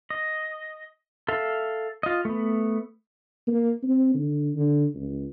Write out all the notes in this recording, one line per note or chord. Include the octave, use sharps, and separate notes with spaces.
D#5
A4 E5 F5
F4 D#5
A3 B3
A#3
C4
D3
D3
C#2